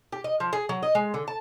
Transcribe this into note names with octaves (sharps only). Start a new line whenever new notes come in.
G4
D#5
F3
G#4
F#3
D#5
G#3
D3
A5